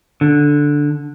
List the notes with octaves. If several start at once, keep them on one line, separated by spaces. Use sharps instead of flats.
D3